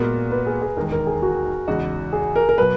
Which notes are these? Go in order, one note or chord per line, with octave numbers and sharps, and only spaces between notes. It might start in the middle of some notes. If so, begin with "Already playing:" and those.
Already playing: A#2 G#3 B3 F#4 A#4
B4
G#4
G#4
E1 D#2 D#3 G#3 A#4
A#4
G#4
F#4
E2 C#3 G#3 D#4 F#4
G#4
A#4
A#4
B2 F#3 B4